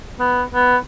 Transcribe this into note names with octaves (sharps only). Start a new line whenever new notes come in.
B3
B3